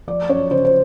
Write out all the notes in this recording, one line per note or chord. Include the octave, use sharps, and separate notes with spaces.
F3 D5
F#2 C#5
C#3 C5
C5